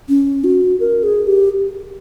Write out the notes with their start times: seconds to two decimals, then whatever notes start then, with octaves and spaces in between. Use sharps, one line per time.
0.09 C#4
0.44 F#4
0.80 A#4
1.03 G#4
1.27 G4